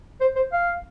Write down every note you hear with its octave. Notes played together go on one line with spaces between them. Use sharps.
C5
C5
F5